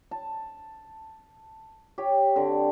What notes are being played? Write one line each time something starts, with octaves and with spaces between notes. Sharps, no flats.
A5
G4 C#5
D3 C4